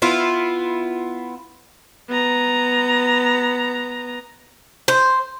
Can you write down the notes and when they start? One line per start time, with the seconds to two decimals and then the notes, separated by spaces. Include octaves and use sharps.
0.02 B3 E4 F4
2.09 B3 A#5
4.88 C5